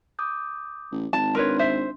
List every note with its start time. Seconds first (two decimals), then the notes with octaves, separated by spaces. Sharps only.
0.19 D6 D#6 G6
0.92 A1
1.13 G#1 A5
1.35 D4 A#4 B4 C#5 C6
1.59 C5 E5